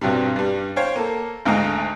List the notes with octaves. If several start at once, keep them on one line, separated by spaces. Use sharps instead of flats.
B1 G2 C3 F#3 G3
G2 G3
C5 C#5 F5 G5
A#3 A4
G#1 D2 G#2 D#4 F5 A#5